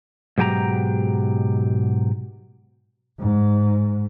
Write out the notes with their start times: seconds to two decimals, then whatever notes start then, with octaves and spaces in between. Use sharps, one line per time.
0.38 G#2 B2 F#3 G4 G#5 A#5
3.19 G#2